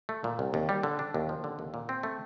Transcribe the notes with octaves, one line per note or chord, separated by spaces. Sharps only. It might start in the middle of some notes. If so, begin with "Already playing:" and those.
A3
A#2
C2
D#2
G3
D3
D4
D#2
F3
D3
D#2
A#2
C4
A3